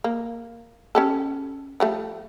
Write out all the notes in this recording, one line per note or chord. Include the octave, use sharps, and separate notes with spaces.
A#3
C#4 G4 A4
F3 G3 A3